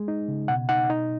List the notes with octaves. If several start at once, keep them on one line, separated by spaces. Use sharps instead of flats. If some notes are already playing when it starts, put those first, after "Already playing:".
Already playing: G#3
D#4
C#3
B2 F#5
D#4 F#5
D#4